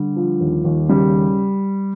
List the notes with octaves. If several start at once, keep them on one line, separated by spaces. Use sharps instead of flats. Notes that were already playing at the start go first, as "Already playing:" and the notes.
Already playing: D3 G3
F3
D#2
D#2
C#3 G3